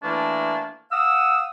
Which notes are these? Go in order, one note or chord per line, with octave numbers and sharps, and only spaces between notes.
E3 A3 A#3 D4
F5 F#5 D#6 E6